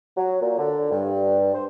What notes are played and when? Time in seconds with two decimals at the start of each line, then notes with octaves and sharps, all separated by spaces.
0.16 F#3
0.41 A#2
0.57 D3
0.90 G2
1.54 C5